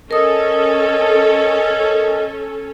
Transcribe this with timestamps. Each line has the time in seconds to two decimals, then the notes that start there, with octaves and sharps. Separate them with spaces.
0.11 C#4 A4 A#4 D#5 D#6